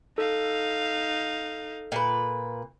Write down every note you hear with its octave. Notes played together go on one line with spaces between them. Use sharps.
D#4 A4 F5
A#2 B4